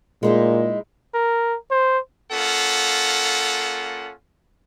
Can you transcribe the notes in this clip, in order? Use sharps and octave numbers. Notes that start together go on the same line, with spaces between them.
A#2 G#3 D#4 E4
A#4
C5
A#3 C#4 F4 A4 F#5